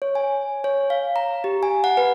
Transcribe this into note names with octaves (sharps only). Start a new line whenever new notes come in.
C#5
G#5
C#5
F5
A#5
G4
G#5
F#5
B4